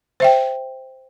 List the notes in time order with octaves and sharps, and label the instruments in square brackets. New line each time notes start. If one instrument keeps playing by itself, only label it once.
[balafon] C5 E5 G5